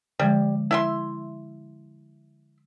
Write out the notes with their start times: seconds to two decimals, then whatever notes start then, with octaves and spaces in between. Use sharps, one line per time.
0.19 D3 F3 G3 G#3
0.71 E4 E5 C6